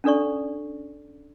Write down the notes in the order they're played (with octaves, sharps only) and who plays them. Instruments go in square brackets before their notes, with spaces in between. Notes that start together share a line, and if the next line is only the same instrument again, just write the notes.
[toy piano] C#4 D4 A4 D5 C#6